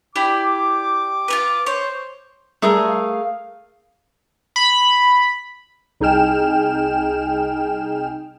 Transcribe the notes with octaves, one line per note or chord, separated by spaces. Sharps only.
E4 G4 D5 D6
F4 G4 B4
C5 C#5
G3 A3 G#4 A#4
F5
B5
C2 D#4 G#4 G5 F6 E7